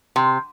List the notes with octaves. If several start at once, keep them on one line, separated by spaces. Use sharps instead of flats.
C3